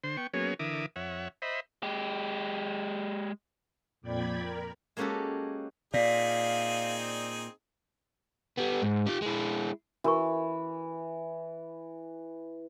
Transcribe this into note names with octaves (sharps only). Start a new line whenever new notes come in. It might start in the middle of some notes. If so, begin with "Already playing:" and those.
D3 C5 C6
B3 G5 C#6
F#3 A#3 B3 C#4 G#4 C#5
D3 E3 A#4 E5 D6 D#6
F2 C#5 E5 F#5
C5 D#5 E5 B5
G#3 G4
F2 A#2 D5 G5 B5 G#6
A#4
G#3 A#3 C#4 F#4 G4 A4
A#2 C4 D#4 G#4 D5 F5
G3 B3
G#2
F4 G4
G#3 E4
E3 F#4 A#4 C#6